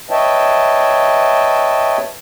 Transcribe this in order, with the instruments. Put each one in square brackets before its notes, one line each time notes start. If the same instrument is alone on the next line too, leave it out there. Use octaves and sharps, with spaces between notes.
[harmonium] B4 C#5 D#5 E5 G5 A5